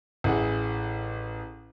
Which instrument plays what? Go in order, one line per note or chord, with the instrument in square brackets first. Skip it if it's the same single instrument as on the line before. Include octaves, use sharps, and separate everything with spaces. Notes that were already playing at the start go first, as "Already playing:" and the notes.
[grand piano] A1 E4 G#4 F#5